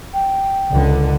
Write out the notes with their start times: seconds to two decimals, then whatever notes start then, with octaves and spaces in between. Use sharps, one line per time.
0.14 G5
0.71 C#2 D3